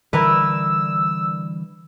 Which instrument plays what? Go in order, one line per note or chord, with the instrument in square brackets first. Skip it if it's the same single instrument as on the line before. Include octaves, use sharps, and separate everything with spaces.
[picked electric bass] D3 E3 G3 [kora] E4 A#4 B4 [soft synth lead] E6